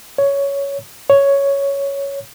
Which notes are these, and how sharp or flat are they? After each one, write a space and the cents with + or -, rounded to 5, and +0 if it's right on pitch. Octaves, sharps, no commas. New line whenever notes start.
C#5 +10
C#5 +5